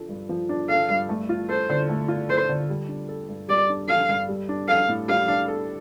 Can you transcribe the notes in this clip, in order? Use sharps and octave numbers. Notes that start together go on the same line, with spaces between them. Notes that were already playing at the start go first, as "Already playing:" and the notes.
Already playing: F3 D4 A4
G2
F3
D4
A4 F5
G2
A3
F4
A4 C5
D3
A3
F4
A4 C5
D3
G3
D4
A4
G2
G3 D5
D4
A4 F5
G2
G3
D4
A4 F5
A2
G3 F5
D4
A4